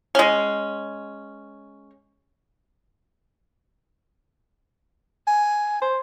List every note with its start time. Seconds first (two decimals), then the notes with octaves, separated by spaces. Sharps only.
0.15 G#3 C#4
5.28 G#5
5.82 C5